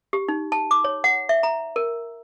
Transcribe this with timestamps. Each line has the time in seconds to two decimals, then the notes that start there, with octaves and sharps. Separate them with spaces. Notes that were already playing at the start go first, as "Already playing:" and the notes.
0.13 G4
0.28 D#4
0.52 A5
0.71 D6
0.84 C#5
1.04 F#5
1.29 E5
1.43 A#5
1.76 A#4